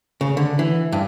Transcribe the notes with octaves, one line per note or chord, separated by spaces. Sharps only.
C#3
D3
E3
G2